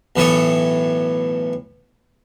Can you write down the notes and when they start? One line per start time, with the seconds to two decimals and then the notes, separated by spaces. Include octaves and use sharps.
0.16 B1 A2 E3 A4 C#5 D#6